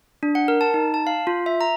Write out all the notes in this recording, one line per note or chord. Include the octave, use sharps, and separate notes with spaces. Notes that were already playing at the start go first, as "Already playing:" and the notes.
D4
F#5
A#4
A5
D#4
A5
F5
F4
E5
A#5